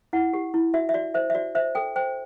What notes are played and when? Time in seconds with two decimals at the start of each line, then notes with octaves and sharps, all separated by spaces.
0.13 E4 F#5
0.33 G4
0.54 E4
0.74 F#4 E5
0.89 E5
0.94 F#4 D5
1.14 C5 E5
1.30 E5
1.35 F#4 D5
1.55 C5 E5
1.75 A4 G5
1.96 C5 G5